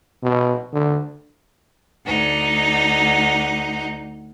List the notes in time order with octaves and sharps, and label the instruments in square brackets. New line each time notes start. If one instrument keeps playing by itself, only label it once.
[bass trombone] B2
D3
[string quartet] D2 D#4 F#5